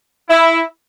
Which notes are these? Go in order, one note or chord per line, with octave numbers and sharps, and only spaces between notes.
E4